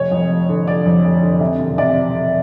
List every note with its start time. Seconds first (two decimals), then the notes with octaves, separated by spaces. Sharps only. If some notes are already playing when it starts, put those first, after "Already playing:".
Already playing: F1 C#5
0.11 F2
0.29 F1
0.49 D3
0.66 F1 D5
0.85 F2
1.04 F1
1.23 D3
1.40 C3
1.60 E1
1.78 C3 D5